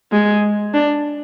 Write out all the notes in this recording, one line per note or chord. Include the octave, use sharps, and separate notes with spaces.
G#3
D4